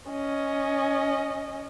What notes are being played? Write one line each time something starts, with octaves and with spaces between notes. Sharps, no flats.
C#4 D#5